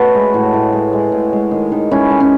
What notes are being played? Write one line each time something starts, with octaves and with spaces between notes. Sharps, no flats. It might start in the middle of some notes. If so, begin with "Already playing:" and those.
Already playing: A3 F#4 A4 B4 C#5 D#5
G#3
A2
A2
G#3
G#3
A2
G#3
D#3
D#3
G#3 C#4 E4
G#3
C#4